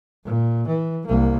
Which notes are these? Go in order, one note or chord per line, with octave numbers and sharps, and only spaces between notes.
A#2
E3
C2 A#3